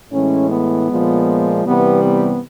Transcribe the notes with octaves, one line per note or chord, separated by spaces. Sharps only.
A2 E3 G#3 C#4
B3
A#2 F3 G#3
C3 E3 G3 B3
B3